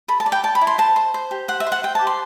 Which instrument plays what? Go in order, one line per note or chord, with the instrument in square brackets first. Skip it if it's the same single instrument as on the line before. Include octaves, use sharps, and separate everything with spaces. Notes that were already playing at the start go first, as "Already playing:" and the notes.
[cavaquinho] A4 B5
A5
D5
G5
D5 A5
B5
E4
C6
C5 A5
C5
C5
G4
C5 F#5
E5
C5
F#5
C5 G5
A5
G4
C6